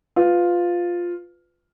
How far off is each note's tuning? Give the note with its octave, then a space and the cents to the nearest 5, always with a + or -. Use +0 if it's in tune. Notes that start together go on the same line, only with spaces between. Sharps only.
F4 +5 B4 +20